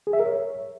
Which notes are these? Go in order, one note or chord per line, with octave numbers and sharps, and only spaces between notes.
G#4
E5
A#4
C#5